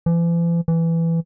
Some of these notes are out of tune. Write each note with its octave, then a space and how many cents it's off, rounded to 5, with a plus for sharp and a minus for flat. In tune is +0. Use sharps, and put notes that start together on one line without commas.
E3 +45
E3 +10